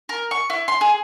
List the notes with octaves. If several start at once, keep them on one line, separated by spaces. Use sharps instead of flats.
A#4
C#6
E4
C6
G#4